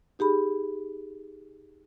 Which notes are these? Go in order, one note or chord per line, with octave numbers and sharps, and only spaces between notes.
D#4 G4 G#4 B5